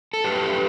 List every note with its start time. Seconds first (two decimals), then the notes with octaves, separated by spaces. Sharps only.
0.13 A4
0.24 F#2 F#3 A3 G4 B4